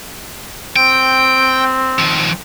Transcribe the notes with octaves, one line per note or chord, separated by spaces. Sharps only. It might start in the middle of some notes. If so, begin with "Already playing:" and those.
C4 G5
D#3 F3